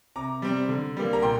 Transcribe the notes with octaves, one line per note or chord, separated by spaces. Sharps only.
C3 A#5 D6
G3 C4
D3
G3 A#3
A#5
A#2 G5 C6